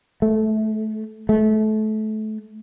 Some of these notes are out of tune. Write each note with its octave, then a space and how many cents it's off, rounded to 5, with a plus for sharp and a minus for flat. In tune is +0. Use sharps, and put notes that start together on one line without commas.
A3 -20
A3 -25